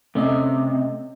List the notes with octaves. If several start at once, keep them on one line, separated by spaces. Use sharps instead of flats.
C3 A3 C#4 D#5